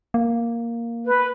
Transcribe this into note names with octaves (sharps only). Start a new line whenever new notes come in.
A#3
B4